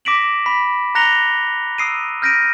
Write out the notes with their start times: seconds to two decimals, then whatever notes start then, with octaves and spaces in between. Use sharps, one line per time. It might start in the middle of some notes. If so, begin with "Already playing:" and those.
0.05 D6 A#6 B6 D7 E7 F#7
0.46 B5 B6
0.95 A#5 F#6 A#6 C#7 F7 G7
1.78 D#6 E6 C7 D7 D#7
2.22 F6 G6 A#6 B6 D7 D#7